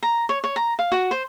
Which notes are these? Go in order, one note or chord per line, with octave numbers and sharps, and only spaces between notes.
A#5
C#5
C#5
A#5
F5
F#4
C5